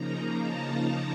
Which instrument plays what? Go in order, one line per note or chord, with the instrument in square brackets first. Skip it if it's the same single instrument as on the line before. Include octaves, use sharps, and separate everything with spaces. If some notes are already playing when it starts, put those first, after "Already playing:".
Already playing: [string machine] C#3 F3 A#3 D#4 A#5
A5